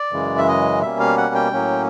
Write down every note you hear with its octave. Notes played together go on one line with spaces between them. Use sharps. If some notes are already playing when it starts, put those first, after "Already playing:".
Already playing: D5
F#2 C#3 E3 G#3
E5
D#5
B2 G3 A#3 C#4 E5
F5
F#5
G5
A2 F#3 A#3 C#4